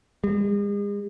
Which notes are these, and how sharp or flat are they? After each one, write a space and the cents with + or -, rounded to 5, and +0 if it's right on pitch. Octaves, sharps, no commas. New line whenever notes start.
G#3 -40